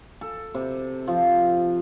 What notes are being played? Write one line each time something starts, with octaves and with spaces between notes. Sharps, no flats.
A4
C3
F3